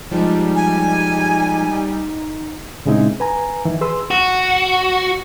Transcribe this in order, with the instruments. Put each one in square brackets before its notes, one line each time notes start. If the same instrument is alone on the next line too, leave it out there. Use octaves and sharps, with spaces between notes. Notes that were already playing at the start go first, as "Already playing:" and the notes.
[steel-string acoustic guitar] F3 G#3 [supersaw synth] G3 [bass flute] D#4
[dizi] G#5
[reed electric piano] A#2 C#3 G#3 C4 D#4 E4
B4 G#5 A#5
D#3 E3 E4
G#4 B4 C6 E6
[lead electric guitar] F#4